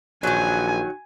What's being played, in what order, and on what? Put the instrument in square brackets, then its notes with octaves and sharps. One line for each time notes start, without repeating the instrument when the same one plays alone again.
[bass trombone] A#1 [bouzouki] D#3 F#3 [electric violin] G#5